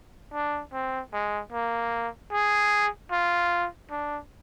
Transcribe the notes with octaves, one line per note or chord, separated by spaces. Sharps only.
D4
C4
G#3
A#3
G#4
F4
D4